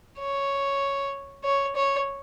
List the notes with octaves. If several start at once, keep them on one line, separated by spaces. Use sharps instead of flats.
C#5
C#5
C#5